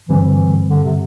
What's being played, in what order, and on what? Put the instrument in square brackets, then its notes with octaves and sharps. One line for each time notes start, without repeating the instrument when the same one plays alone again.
[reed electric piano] G2 D3 G3 C4 [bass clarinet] E3
[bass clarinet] E3
D3
C3